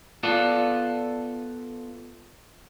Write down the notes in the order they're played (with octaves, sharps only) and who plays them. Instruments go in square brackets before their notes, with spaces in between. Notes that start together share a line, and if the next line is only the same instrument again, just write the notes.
[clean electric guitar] B3 F4 A4 D5